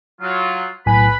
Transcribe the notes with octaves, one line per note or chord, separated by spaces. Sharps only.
F#3 F4
B1 A2 B4 G#5 B5